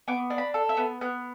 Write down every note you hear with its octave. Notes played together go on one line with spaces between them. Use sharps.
B3 D6
D4
B5
A4
E5
B3
B3 F#6